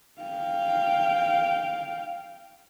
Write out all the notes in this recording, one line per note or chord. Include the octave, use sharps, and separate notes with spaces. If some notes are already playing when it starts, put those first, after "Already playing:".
F5 G5